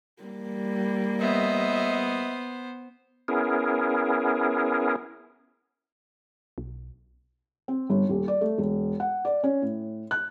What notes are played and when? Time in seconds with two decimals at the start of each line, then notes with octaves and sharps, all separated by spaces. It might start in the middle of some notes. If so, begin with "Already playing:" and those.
0.23 G3 A#3
1.20 B3 C5 D#5 E5
3.28 B3 C#4 E4 G#4 A#4
6.58 B1
7.68 C4
7.90 G1
8.09 D#1
8.28 D5
8.41 A3
8.58 E1
9.00 F#5
9.25 D5
9.43 C#4
9.62 A2
10.11 F#6